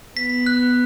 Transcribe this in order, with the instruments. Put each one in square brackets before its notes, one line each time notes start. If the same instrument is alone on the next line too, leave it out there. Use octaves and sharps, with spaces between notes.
[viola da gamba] B3 [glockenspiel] B6
[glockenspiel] F#6